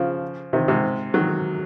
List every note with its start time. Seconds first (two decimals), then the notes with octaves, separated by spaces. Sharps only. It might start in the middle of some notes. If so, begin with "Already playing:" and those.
Already playing: C#3 F3
0.53 C3 D#3
0.68 G#2 C3
1.14 D#3 F#3